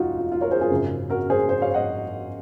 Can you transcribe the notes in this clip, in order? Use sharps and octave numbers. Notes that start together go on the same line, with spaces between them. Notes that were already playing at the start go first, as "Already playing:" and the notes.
Already playing: F1 D#2 D#4 F4 F#4
F4
F4
A#4 C#5
G#4 C5
F4 G#4
G#1 F#2 C#3
F#4 A#4
G#4 C5
G#4 C5
C#5 F5
D#5 F#5